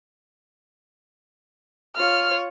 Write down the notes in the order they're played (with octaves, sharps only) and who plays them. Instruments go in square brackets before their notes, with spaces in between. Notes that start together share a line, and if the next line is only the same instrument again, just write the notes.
[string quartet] F4 C#5 [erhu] F6